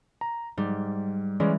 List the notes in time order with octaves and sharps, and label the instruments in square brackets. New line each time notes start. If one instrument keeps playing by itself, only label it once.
[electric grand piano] A#5
[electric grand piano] G#2 [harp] G3
[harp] E3 [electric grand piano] G#3 C#4 D5